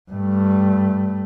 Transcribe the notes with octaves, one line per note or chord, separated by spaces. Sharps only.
G2 A3